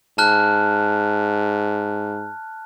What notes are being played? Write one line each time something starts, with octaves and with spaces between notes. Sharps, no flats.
G#2 A5 F6 F#6